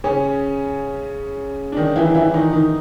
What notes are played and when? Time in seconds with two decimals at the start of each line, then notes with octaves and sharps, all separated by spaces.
0.04 C#3 C#4
1.72 D4
1.77 D#3 D#4
1.96 E3 E4
2.15 E3 E4
2.34 D#3 D#4
2.53 D#3 D#4